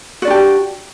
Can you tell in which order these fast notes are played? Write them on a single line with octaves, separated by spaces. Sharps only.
F#4 D5 D4 G4